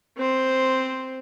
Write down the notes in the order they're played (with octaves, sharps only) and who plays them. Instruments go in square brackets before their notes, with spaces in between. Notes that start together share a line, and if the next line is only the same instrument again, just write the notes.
[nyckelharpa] C4 C5